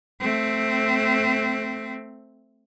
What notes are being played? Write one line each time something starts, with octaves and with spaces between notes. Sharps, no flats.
A3 C4